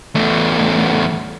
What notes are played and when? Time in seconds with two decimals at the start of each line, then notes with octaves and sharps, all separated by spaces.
0.15 E2 A3